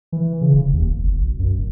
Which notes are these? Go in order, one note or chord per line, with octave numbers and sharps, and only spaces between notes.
E3
C#3
E1
D#2
F1
G1
B1
F#2
F1